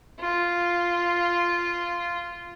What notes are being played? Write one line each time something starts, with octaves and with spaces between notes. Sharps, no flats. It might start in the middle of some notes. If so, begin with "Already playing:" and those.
F4